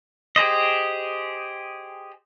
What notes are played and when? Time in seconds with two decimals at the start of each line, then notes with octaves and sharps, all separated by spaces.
0.36 G4 G#4 C5 D#5